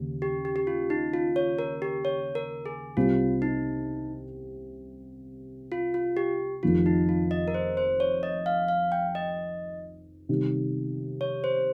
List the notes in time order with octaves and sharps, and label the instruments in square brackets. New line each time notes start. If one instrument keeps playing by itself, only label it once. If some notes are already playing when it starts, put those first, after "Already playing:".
Already playing: [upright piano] D#2 C#3
[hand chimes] G4
G4
G4
F4
D#4
F4
C#5
A#4
G4
C#5
A#4
G#4
[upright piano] C2 C3 G3 C4 [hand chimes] F4
[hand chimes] D#4
F4
F4
G4
[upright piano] F1 F2 D#3 [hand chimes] F4
[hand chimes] D#4
F4
D#5
A#4
C5
C5
C#5
D#5
F5
F5
G5
D#5
[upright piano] C3 D#3 G3
[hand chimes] C#5
C5